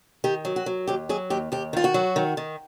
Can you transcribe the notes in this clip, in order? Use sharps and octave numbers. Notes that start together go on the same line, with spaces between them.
D#3 G4
F#3
F#4
F#3
D#2 G4
F#3 G#4
D#2 G4
D#2 G4
D#3 F4
F#4
F#3
D#3
D#3